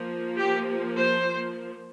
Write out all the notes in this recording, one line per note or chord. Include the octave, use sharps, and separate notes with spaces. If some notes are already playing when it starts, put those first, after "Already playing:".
Already playing: F3 A#3
G4
C5